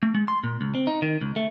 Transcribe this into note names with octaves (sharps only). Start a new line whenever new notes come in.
A3
G#3
C6
A#2
C#2
C4
D#4
D#3
C#2
A3